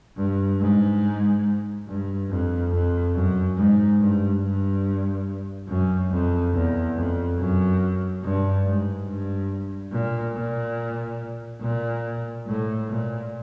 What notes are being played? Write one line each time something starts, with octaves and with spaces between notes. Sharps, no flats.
G2
G#2
G2
F2
F2
F#2
G#2
G2
G2
F#2
F2
E2
F2
F#2
G2
G#2
G2
A#2
A#2
A#2
A2
A#2